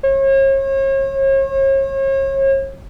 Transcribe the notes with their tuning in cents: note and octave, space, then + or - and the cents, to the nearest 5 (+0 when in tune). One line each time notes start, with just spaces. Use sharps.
C#5 -40